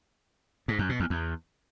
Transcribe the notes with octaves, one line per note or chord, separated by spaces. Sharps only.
G#2
F#2
B2
E2
E2